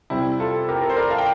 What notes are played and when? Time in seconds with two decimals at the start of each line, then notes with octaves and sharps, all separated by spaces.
0.10 C3 G3 C4 E4 G4
0.40 F4 A4
0.69 G4 A#4
0.82 A#4
0.90 C5
0.97 A#4 D5
1.11 F5 A5
1.18 G5